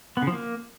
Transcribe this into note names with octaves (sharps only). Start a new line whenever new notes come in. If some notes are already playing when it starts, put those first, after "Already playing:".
B3
C#3
F3
A#3